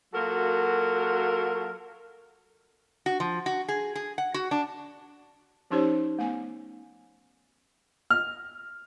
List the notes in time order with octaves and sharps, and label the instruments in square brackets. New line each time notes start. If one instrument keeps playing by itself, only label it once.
[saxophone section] F#3 A#3 F4 F#4 A4 A#4
[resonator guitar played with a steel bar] F#4
F3
F#4
G#4
G#4
F#5
F#4
D4
[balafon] F3 C#4 D#4 G4 C5 C#5
A3 B3 G#5
[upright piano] F6